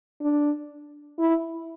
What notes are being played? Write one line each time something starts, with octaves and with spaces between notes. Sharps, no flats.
D4
E4